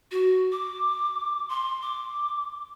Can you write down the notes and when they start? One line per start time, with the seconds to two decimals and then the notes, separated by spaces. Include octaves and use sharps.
0.11 F#4
0.52 D6
1.49 C6
1.81 D6